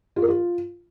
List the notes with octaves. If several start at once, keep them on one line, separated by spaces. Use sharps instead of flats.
F4
A#4
F4